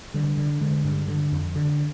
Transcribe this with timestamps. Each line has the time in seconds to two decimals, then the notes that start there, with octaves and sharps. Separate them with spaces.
0.14 D3 G3
0.37 D3
0.61 D3 G#3
0.84 G2
1.08 D3
1.32 F2
1.56 D3